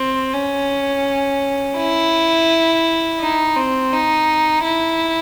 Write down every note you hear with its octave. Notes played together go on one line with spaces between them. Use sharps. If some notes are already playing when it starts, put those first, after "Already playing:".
Already playing: C4
C#4
E4
D#4
C4
D#4
E4